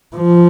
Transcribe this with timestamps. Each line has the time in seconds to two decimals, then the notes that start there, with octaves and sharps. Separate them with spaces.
0.16 F3